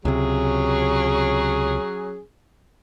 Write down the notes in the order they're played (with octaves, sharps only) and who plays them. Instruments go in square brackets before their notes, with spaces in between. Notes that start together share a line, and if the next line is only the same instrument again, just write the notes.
[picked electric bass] C#2 C3 [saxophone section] F#3 C#4 G#4